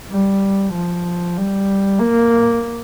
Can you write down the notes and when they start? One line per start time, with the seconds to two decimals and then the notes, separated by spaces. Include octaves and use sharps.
0.11 G3
0.74 F3
1.37 G3
1.99 A#3